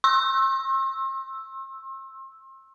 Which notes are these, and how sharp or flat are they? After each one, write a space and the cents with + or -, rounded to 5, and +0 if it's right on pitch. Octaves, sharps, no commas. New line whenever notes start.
C6 +40 E6 +0